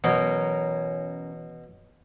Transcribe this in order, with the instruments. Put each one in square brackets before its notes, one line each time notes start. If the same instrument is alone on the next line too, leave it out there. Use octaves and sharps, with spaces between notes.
[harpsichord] B2 [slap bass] E3 F#3 [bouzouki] C#4 A#4 C#5